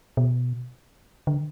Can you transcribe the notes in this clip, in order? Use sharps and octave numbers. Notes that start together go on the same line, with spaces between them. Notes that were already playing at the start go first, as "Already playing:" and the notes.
B2
D3